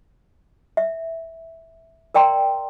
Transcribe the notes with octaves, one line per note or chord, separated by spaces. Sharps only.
E5
A#4 D5 G5 A#5 C6